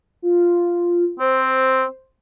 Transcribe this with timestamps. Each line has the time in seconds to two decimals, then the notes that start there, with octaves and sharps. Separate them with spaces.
0.22 F4
1.20 C4 C5